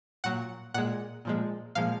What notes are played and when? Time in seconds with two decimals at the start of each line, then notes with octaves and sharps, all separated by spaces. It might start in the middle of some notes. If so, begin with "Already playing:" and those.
0.24 A#2 F#3 F#5
0.74 A#2 G#3 F#5
1.25 A#2 F3 G#3
1.75 A#2 F3 G#3 F5